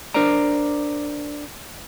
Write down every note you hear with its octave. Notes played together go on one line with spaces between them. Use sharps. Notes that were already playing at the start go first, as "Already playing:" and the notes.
D4 A#4 C5 D5 A#5